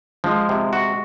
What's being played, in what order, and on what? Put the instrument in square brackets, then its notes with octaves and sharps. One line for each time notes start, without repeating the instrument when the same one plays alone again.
[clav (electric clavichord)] F3 [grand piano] G#3
[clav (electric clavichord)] C3
F#4